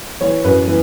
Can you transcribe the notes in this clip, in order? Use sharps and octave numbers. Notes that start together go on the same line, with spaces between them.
E3 C#5
F#2 B4
E3